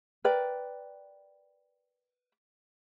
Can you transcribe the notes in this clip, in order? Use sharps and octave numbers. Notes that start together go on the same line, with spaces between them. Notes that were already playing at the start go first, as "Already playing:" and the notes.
A#4 B4 D5 G5